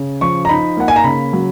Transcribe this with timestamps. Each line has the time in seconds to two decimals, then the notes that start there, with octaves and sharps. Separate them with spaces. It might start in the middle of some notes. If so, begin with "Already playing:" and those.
Already playing: C#3
0.21 F3 C#6
0.45 A#5
0.49 D#4 B5
0.77 A#3 F#5
0.88 G#5
0.96 A#5
1.04 C#3 B5
1.33 F#3